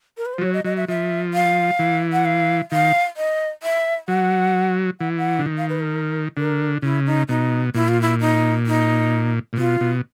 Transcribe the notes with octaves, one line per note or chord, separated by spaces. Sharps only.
A#4
B4
C5
F3
F#3 C#5
D#5
F#3 D#5
E5
F3 E5
F5
E3
F#5
F5
D#3 F5
D#5
E5
F#3 F#5
E3 F#5
F#5
D3
D#3
F5
B4
A#4
D3 A#4
C#3 E4
D#4
B2 D#4
A#2 E4
F4
E4
D#4
D#4
A#2
B2 F4
B2